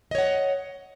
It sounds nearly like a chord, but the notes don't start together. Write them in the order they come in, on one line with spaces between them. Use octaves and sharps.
D#5 C#5 F#5